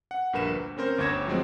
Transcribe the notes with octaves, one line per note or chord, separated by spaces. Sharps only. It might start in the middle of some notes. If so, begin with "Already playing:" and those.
F#5
A#1 G2 A#4 B4 E7
D2
C4 C#4 A#4 C5
G1 D2 C#5 G#6 A#6 E7
F3 F#3 G#3 C4